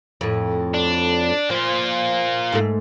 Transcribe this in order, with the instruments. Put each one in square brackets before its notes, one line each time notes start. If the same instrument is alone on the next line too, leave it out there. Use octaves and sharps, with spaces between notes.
[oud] F2 A2
[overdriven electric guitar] D4
[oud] F3 [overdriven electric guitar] A#3 F4
[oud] G#2 A3